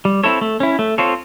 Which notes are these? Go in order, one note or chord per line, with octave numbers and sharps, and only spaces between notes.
G3
C4 E4 A4 C#5
A3
C#4 E4
A3
C4 F4 A4 C#5